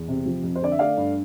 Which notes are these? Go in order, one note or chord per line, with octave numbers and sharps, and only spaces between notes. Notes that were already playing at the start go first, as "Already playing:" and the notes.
Already playing: E2
C3
F3
F2
C5
D3 D5
E5
A3 D5 F5
G2